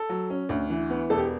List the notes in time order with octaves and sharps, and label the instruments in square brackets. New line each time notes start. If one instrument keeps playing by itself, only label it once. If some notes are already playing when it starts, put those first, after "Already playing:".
Already playing: [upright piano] A4
F#3
C#4
D2
E3
B3
E1 A4
G4